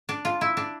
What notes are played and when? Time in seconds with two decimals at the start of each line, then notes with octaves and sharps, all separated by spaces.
0.09 D4
0.25 F4
0.41 E4
0.57 D4